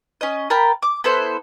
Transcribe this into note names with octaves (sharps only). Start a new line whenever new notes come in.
C#4 D#5
A#4 G5 A5 B5
D6
B3 E4 A4 C5